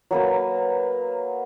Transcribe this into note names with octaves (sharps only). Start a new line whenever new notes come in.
F#3 A#3 B4